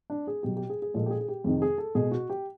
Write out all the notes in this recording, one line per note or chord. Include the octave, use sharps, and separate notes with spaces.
D4
G#4
B2 F#3 G4
G4
G#4
G#4
A#2 F3 G#3 A4
G4
G#4
G#4
G4
F2 C3 D#3 G#4
G#4
A4
B2 G#3 G#4
F#4
G4